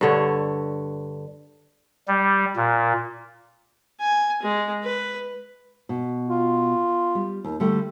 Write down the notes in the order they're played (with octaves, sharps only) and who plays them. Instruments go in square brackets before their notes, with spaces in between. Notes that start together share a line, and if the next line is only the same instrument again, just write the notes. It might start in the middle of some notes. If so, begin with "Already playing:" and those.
[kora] G2 D3 C#5
[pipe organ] G3
A#2
[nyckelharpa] G#5
G#3
B4
[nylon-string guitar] B2
[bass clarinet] F4
[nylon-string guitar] G3
D#2
D3 G3 A3